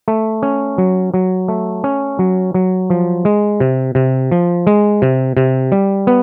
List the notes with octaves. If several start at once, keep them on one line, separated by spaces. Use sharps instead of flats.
A3
C#4
F#3
F#3
A3
C#4
F#3
F#3
F3
G#3
C3
C3
F3
G#3
C3
C3
G3
B3